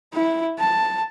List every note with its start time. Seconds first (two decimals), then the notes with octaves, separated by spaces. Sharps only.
0.14 E4
0.59 A5